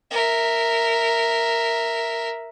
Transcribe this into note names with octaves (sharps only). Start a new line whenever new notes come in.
A#4 E5